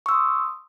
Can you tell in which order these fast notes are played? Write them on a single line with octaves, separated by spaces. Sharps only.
C#6 E6 C6 D#6